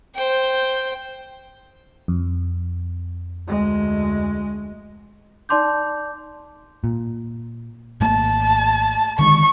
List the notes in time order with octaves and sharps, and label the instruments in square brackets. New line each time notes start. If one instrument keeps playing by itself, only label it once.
[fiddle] C5 G5
[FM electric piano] F2
[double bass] D2 G#3
[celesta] D#4 D5 A5 C6 D6 G6
[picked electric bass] A#2
[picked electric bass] G#1 A3 A#3 [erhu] A5
[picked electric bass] D3 D#3 G#3 [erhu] C#6